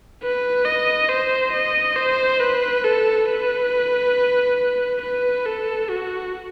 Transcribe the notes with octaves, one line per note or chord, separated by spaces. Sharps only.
B4
D#5
C5
D#5
C5
B4
A4
B4
B4
A4
F#4